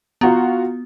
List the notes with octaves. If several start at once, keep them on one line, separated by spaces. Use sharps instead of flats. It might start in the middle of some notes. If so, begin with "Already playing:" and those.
B3 F4 F#4 A#5